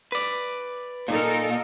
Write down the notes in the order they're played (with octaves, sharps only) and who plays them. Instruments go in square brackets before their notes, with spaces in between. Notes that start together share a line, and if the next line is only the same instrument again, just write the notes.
[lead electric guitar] B4 D5
[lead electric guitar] A#2 [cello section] D#4 A4 A#4